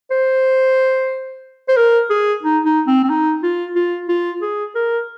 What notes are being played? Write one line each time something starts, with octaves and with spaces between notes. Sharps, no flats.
C5
C5
A#4
G#4
D#4
D#4
C4
C4
D#4
F4
F4
F4
G#4
A#4